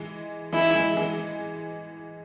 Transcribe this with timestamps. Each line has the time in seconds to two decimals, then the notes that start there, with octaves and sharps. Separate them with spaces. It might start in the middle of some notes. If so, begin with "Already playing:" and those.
Already playing: E3 G#3
0.52 E3 G#3 E4
0.75 E3 G#3
0.97 E3 G#3